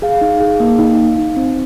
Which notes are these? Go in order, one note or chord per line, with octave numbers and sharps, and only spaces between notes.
G#4 F5
D#4
G#4
A#3
D#4
D#4
D#4
C4